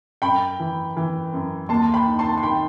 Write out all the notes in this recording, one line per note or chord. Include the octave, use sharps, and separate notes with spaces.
F#2 G5 B5
E3
E3
F#2
D#2 A5 C6
G5 B5
D#3
A5 C6
C6
D#3 G5 B5